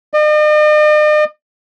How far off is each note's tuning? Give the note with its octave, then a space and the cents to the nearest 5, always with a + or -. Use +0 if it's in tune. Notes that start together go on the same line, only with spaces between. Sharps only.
D#5 -45